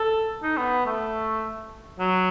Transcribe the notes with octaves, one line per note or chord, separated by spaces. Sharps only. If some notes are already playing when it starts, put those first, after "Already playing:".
Already playing: A4
D#4
B3
A3
F#3